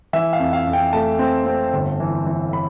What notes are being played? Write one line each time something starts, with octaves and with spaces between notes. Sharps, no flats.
E3 E5
F5
F2
F5
F2
G5
A3 A5
C4
C4
G1
E3
E3
B5